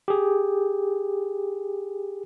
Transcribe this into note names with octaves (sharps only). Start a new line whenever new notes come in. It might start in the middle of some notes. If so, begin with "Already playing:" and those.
G4 G#4